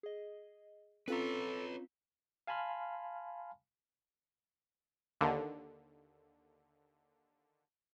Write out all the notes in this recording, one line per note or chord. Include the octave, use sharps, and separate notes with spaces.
G#4 D#5
C4 C#4 F4 A4 B4 C#5 A#5 B6
F5 G#5 A5 B5 C6 F6
D#2 D3